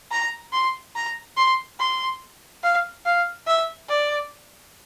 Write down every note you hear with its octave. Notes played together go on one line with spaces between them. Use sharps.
A#5
C6
A#5
C6
C6
F5
F5
E5
D5